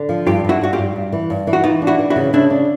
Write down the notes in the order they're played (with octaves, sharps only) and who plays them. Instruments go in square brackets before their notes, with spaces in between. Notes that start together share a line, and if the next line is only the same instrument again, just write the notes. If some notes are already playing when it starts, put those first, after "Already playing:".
Already playing: [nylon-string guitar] D3
F3
[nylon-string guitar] G2 [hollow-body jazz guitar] F4 G4
[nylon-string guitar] G2 [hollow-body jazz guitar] E4 F#4
[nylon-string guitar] G2 [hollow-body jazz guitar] F#4
[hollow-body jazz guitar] F4 G4
[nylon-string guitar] G2
G2
E3
G2
E3
[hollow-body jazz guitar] F#4
[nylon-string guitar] E3 [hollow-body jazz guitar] D#4 F4
[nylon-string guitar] D4
[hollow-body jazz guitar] E4 F#4
[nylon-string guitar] E3
[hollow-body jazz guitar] E4 F#4
[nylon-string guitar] C#3
[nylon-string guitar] C#3 [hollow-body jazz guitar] D4 E4
[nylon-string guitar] D4